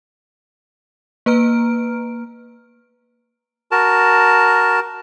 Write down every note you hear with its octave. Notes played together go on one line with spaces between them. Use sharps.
A#3 B4 A#5 F6 D7
F#4 A#4 A5